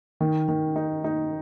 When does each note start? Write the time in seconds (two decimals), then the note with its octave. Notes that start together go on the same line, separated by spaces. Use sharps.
0.21 D#3
0.48 D#3
0.76 D#4
1.04 D#4